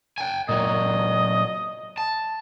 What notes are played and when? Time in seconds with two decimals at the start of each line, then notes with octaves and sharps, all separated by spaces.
0.18 G5 G#5
0.49 A#2 F#3 D#5
1.98 A5